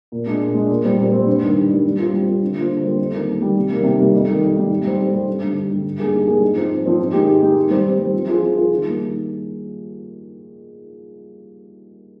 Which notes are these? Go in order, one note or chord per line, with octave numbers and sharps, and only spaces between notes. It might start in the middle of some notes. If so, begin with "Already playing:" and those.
A#2
G#3 D4
A#2
G#3 D4
A#2
G3 C4
A#2
G3 C4
G2
D#3 G3
G2
D#3 G3
G3
C4 F4
G3
C4 F4
D3
G3 A#3 F4 C5
D3
G3 A#3 F4 C5
F2
D#3 G3 A#3
F2
D#3 G3 A#3
C3
D#3 G3 A#3
C3
D#3 G3 A#3
F2
D#3 G3
F2
D#3 G3
G#2
G3 C4
G#2
G3 C4
G2
D3 G3
G2
D3 G3
G#2
G3 A#3 D4 G#4
G#2
G3 A#3 D4 G#4
G#2
F3 C4 D#4
G#2
F3 C4 D#4
G#2
D#3 G#3 D#4 G4
G#2
D#3 G#3 D#4 G4
D#3
G3 C4
D#3
G3 C4
F3
C4 F4 G#4
F3
C4 F4 G#4
D#3
G3 A#3 D#4
D#3